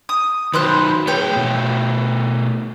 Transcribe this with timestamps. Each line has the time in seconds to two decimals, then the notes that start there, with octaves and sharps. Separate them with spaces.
0.09 D#6
0.54 D#3 F#3 B4 C5 F#6
1.07 A3 G#4 B4 C#5 G5
1.36 B2 A3